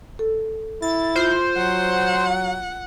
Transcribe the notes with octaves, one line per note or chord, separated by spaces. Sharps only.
A4
E4 A6
F4 C5
F#3 F#5